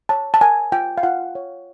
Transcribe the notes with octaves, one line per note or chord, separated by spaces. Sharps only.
C#5 A5
A5
A#4 G#5
F4 G5
F5
F4 F#5
C#5